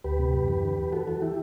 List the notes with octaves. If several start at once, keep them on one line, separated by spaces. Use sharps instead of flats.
D2 G4 B4
C3
F#2
E3
D3
E2
E3 F#4 A4
E3 F#4 A4
E3 E4 G4